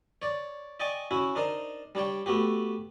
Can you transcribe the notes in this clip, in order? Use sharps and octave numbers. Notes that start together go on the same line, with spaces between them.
C#5 D5
D5 D#5 G5 G#5 C#6 D6
C#4 E4 F#4
D4 D#4 A#4 C5
G3 D4 C#5 G5
A3 B3 F#4 G4